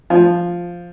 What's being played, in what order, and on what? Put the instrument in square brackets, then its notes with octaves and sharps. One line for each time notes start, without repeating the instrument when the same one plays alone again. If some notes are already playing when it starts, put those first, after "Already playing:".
[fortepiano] F3